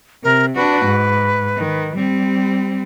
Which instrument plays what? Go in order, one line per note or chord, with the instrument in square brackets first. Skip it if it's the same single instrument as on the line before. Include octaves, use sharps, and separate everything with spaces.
[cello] C3 [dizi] A#4
[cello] D4 F#4 [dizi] B4
[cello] G#2
D#3
G3 C4